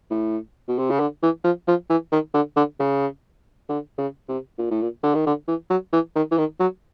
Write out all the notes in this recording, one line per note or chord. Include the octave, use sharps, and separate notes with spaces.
A2
B2
C3
C#3
D3
E3
F3
F3
E3
D#3
D3
D3
C#3
D3
C#3
C3
A#2
A2
A#2
D3
D#3
D3
E3
F#3
E3
D#3
E3
D#3
F#3